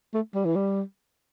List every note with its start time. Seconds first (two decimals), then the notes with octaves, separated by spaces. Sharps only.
0.14 A3
0.35 G3
0.45 E3
0.55 G3